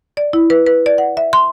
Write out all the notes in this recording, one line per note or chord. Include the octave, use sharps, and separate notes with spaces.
D5
E4
B4
B4
D5
F#5
E5
C6